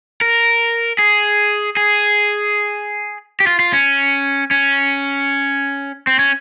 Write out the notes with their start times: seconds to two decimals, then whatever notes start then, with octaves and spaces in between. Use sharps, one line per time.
0.21 A#4
0.99 G#4
1.77 G#4
3.40 G4
3.47 F4
3.59 F4
3.73 C#4
4.51 C#4
6.07 C4
6.19 C#4